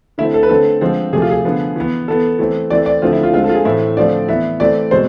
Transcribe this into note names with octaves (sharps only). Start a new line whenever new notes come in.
D3 A3 C4 E4
A4
B4
D3 A3 C4 A4
D3 F3 G#3 C4
C3 F3 A3 G#4
F4
G#4
D3 F3 B3
E3 B3
E3 B3 A4
E3 A3 C4
E3 A3 C4 D5
D5
D3 F3 A3 C4 F4
E4
F4
D3 G#3 C4 F4
A4
F4
G#4
A2 E3 A3 C4 E4
D3 F3 A3 C4 D5
E3 B3 E5
E3 A3 C4 D5
B2 G#3 C4 C5